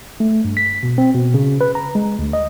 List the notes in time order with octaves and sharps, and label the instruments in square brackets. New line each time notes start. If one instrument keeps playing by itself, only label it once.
[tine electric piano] A3
G2
B6
B2
C4
B2
C#3
B4
A#5
G#3
D2
D#5